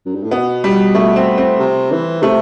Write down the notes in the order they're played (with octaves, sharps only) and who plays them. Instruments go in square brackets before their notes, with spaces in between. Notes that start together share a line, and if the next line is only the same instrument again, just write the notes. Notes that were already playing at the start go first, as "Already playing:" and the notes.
[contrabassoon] F#2
G2
A2
[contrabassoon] B2 [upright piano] B3
[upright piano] G3
A3
C4
C4
[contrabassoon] C3
E3
[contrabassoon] C3 [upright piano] A3